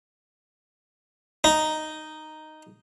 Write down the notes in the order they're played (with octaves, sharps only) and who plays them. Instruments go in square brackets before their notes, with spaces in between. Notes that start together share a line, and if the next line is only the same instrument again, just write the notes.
[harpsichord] D#4